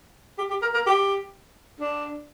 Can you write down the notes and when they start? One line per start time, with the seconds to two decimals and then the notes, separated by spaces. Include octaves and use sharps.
0.38 G4
0.50 G4
0.62 A#4
0.74 A#4
0.87 G4
1.80 D4